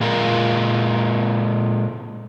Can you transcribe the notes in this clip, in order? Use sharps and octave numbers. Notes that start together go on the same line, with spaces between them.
A#2 G#3 F4 A#4